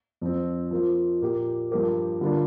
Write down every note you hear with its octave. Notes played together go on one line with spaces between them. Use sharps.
F2 F3 C4
F3 A#3 F4 C5
A#2 A#3 G4
G2 F3 A#3 G4 A#4
D3 G3 A#3 D4 F4